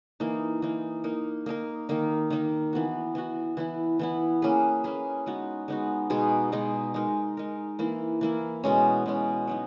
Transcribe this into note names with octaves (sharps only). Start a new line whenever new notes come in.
E3 A#3 D#4
E3 A#3 D#4
A#3 D#4 A#4
A#3 D#4 A#4
D#3 A#3 D#4
D#3 A#3 D#4
E3 B3 F#4
E3 B3 F#4
E3 B3 E4
E3 B3 E4
A#3 C#4 G#4 B4
A#3 C#4 G#4 B4
G#3 B3 D#4 F#4
G#3 B3 D#4 F#4
B2 G#3 D#4 G#4
B2 G#3 D#4 G#4
G#3 D#4 A#4
G#3 D#4 A#4
E3 A#3 E4
E3 A#3 E4
B2 G#3 C#4
B2 G#3 C#4
F#3 B3 D#4